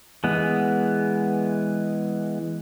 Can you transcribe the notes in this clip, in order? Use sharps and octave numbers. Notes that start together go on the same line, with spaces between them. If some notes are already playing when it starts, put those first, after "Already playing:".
E3 G#3 B3